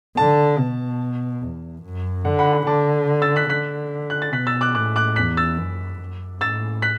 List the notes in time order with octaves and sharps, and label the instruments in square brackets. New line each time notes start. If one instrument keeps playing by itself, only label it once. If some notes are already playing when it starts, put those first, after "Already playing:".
[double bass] D3 [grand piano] A5
[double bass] B2
E2
F#2
[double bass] D3 [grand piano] F#5
[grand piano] F#5 B5
F#5 B5
[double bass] D3 [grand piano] A5 D6
[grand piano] E6 A6
F#6 B6
[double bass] D3 [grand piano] F#6 B6
[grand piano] F#6
A6
[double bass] B2 [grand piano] F#6 B6
[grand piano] E6 A6
D6 F#6
[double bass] A2 [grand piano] D6 F#6
[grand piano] D6 F#6
[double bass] E2 [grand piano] F#6 B6
[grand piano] E6 A6
[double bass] F#2
F#2
[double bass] A2 [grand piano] E6 A6
[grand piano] F#6 B6